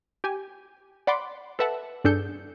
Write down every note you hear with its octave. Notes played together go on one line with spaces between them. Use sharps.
G4 G#5
D5 F#5 B5 C6 D6
A4 B4 E5 F#5 A5
G2 D4 G#4 A4 G6 C#7